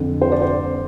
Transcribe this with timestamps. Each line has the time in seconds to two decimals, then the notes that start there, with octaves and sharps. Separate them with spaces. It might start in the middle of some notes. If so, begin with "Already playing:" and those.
Already playing: F2 D3
0.22 C5
0.32 D5
0.42 C5